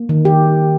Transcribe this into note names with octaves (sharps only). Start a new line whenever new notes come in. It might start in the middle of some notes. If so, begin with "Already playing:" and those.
Already playing: A#3
D#3
G4